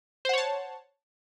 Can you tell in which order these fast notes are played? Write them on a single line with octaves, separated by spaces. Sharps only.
C5 F#5 C#5 A5